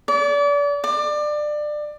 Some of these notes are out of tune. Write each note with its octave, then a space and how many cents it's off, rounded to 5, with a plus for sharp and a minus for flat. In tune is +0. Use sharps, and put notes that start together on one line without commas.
D5 -35
D5 +25